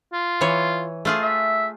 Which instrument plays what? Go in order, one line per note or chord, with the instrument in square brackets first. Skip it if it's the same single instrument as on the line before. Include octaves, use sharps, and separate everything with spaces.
[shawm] F4
[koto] E3 C#5
A3 F4 G#4
[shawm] E5